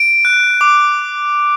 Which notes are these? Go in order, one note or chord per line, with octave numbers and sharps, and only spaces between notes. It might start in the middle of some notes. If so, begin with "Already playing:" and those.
Already playing: D7
F#6
D6